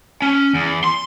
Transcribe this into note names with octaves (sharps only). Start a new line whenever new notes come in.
C#4
E2
C6